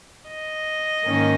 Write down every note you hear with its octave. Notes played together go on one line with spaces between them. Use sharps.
D#5
G#2 D#3 A#3 C#4